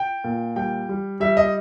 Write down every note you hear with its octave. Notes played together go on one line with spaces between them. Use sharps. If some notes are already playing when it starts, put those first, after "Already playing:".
Already playing: G5
A#2
G3 G5
G3
G3 E5
D#5